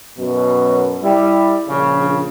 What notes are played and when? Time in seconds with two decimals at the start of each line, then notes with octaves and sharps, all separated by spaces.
0.18 F#2 B2
1.01 G3 E4
1.69 A#1 C#3